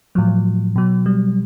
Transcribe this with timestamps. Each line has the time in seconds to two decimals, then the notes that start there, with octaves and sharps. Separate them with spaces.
0.15 A2 F3 F#3
0.76 B2 F#3
1.06 G3